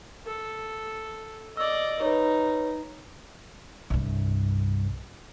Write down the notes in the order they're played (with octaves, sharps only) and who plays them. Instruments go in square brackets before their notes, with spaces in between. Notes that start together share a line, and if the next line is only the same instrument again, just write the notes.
[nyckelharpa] A4
[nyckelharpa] D5 D#5 [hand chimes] E6
[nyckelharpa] D#4 [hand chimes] B4 C#5
[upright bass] C2 G2